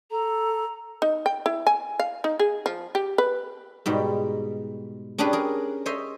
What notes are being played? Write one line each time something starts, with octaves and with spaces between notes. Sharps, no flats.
A4 A#5
D#4
G5
E4
G#5
F5
D#4
G#4
F3
G4
B4
G#2 B2 G3
C#4 D4 G4 G#4 B4
G#4 A#4
C5 C#5 D#5 E5 C6